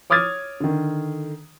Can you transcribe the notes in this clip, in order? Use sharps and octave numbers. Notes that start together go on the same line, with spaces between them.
C#5 D6 D#6 F6 G#6 A6
D3 D#3